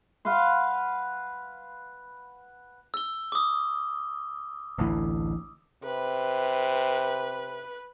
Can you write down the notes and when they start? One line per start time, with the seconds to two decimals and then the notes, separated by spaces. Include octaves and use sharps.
0.25 B4 F5 F#5 C6
2.94 E6 G7
3.32 D6 D#6
4.78 A1 D2 E3
5.84 C3 B4